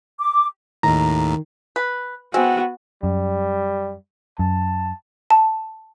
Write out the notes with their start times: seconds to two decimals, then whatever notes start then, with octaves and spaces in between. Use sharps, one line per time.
0.20 D6
0.83 D#2 A2 D#3 A#5
1.76 B4
2.34 G#3 B3 C4 F#4
3.03 F#2 G3
4.39 F#2 A5
5.31 A5